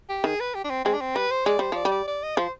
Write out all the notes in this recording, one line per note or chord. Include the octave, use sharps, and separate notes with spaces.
G4
D#3 G#4
B4
G4
D4
C4
G#3 C4
D4
C4
G3 B4
C5
G#3 D5
G3 C5
F3 D5
G3
D5
D5
D#5
F3 C5